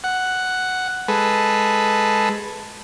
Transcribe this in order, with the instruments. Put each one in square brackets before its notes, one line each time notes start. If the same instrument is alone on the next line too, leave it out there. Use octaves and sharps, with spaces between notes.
[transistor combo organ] F#5
G#3 A4 B4